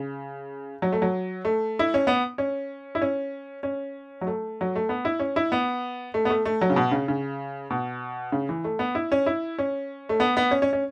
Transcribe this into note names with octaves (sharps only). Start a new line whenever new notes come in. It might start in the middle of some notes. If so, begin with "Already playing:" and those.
Already playing: C#3
F#3
A3
F#3
A3
E4
C#4
B3
C#4
E4
C#4
C#4
F#3
A3
F#3
A3
B3
E4
C#4
E4
B3
A3
B3
A3
A3
F#3
C#3
B2
C#3
C#3
B2
C#3
E3
A3
B3
E4
C#4
E4
C#4
A3
B3
B3
C#4
C#4
C#4